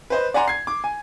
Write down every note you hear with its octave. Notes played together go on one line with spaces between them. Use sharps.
B4 C5 D#5
D5 F#5 G#5 A#5 C6
G#6 C7
D6
G#5